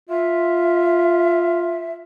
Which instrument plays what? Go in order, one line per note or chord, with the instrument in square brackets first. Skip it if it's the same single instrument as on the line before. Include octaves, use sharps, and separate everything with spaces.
[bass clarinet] F4 [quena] E5